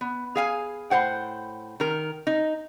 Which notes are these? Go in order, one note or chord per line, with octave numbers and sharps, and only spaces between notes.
B3
G#4 F5 G#5
A2 C5 F#5 G5
D#3 A#4
D#4